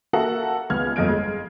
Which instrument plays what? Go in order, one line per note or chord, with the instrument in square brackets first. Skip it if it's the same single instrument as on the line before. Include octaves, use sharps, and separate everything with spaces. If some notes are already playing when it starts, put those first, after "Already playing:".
[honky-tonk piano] A#3 F#4 A4 A#4 E5 F#5
C#2 B3 F6 G#6
G1 F2 D#5 G#6 D7
G#3